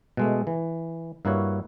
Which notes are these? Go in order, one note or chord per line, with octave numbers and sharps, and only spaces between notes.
B2 G#3 A3
E3
G2 A#3 E4 F#4 C#5